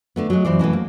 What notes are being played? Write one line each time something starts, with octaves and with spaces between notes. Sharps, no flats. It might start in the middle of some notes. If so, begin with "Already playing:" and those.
D3 A3 B3
F#3 G#3
F#2 E3 C5 D5
B2 E3 A3 B3
A#3